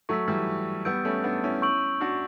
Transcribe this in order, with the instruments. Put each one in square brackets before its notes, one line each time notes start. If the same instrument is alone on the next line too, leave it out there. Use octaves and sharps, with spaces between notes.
[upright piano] F#3 A3 [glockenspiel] C#6 E6 B6
[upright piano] E3 G3
[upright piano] G3 B3 [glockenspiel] E6 G6 D7
[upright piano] A3 C#4
B3 D4
C#4 E4
[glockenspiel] C#6 E6 G6 D7 F#7
[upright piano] D4 F#4